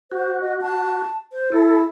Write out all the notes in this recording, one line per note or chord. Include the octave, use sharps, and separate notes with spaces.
F#4 C5
D#5
A5
C5
E4 A4